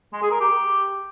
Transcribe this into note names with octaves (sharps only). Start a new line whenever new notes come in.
G#3
G#4
A#4
G4